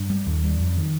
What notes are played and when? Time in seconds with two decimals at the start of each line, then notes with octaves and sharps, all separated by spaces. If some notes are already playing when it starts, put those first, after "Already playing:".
Already playing: G2
0.10 G3
0.26 D#2
0.43 G3
0.60 F2
0.77 D#3